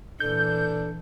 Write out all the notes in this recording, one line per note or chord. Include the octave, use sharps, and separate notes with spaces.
A#2 E3 D4 A4 G6